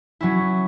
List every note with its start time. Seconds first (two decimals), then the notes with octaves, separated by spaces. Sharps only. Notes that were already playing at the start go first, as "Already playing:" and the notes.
0.21 F#3 C#4 E4